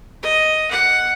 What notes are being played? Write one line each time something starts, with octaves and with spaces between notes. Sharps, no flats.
D#5
F#5